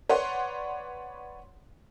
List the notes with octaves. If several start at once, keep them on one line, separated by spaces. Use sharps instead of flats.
B4 C#5 D5 F#5 C6